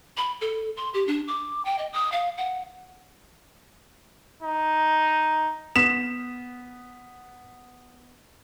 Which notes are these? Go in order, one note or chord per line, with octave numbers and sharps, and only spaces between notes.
B5
A4
C6
G4
D4
D6
G5
D#5
D#6
F5
F#5
D#4
B3 D#6 B6 E7